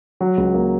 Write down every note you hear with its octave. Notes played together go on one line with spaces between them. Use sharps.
F#3
C#2
A#3